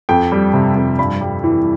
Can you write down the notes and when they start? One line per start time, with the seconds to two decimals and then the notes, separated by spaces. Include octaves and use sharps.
0.09 F2 G5
0.32 G3
0.54 C3
0.76 F2
0.98 G2 B5
1.21 G3
1.44 E3